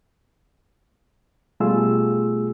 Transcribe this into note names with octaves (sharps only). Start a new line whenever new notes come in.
B2 G3 A3 F4 G#4 E6